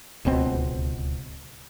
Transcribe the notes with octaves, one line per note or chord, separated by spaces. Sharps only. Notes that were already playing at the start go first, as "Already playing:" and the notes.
D1 C#2 B2 C4